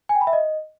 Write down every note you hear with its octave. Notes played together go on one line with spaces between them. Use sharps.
G#5
G5
B5
E5
D#5